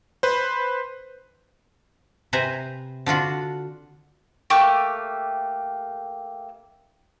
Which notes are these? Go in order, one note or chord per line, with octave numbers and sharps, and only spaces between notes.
B4 C5
C3 B4 C5 G#5 A#5
D3 D4 F4 F#4
A3 A#3 G4 C#6